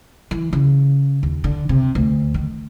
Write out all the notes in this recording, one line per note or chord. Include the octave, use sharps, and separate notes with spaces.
E3
C#3
D#2
D3
C3
D2
D#3